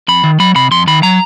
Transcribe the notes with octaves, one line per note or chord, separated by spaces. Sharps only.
F2 B5
D#3
F#3 B5
C3 B5
F2 C6
D#3 B5
F#3 A#5